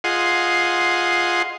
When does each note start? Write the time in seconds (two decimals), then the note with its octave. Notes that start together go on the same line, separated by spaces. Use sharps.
0.04 F4 G#4 D#5 F#5 C6